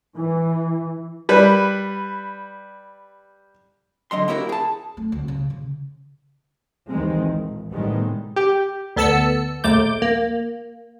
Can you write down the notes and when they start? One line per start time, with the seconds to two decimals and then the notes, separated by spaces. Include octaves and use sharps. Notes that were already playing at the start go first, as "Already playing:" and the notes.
0.15 E3
1.29 G3 B4
4.11 D3 F#3 D#5 C6
4.28 A#3 E4 F#4 G4 A#4
4.49 G#4 A5
4.97 A3
5.12 D2
5.28 C#3
5.50 C#3
6.89 D#2 D#3 E3 G#3 C4
7.19 A#1
7.71 A2 C3 D#3 G3 G#3 B3
8.36 G4
8.96 D2 B3 A4 A5 E6 C#7
9.64 A#1 D#2 A3 D6 G6
10.02 A#3